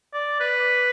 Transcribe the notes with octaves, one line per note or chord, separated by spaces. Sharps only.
D5
B4